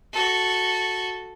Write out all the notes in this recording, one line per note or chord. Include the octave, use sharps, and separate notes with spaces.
F#4 A4